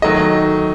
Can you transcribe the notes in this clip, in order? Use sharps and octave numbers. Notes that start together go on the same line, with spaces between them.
D#3 F#3 A3 D#5